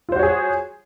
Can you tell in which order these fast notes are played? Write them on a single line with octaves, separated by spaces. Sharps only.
F4 C5 F#4 C#5 G#4